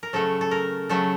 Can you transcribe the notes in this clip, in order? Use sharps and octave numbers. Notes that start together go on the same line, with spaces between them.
A#4
C#3 F#3 A3 A4
A4
A#4
C#3 F#3 A3 A4